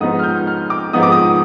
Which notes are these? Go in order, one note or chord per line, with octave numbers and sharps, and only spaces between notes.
G#2 F3 B3 D#4 D#6
F6
G6
F6
D6
G#2 F3 B3 D#4 D#6
D6
D#6